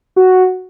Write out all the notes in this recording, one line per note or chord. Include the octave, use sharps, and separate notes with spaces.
F#4